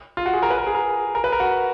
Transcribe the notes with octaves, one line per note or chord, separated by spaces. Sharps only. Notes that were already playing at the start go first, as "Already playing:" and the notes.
F4
F#4
G#4
A#4
B4
A#4
G#4
A#4
A#4
B4
A#4
F#4